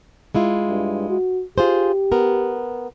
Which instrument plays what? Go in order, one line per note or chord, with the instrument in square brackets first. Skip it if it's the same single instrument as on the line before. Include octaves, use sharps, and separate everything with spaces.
[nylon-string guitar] G#3 E4 F4
[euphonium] G2
F#4
[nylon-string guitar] F4 G#4 C5 [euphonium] G4
[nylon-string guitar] B3 A#4